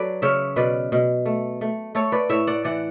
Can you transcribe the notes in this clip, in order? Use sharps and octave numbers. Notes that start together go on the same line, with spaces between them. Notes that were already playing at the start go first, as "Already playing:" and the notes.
Already playing: F#3 F#4 A4 B4 D5
C#3 C#5 E5
B2 B4 D5
B2
A3
A3
A3 A4 C#5
B4 D5
A2 C#5 E5
D5 F#5
E3 D5 F#5